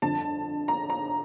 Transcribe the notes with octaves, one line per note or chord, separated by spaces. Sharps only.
G1 F2 D3 A5
A#5
A#5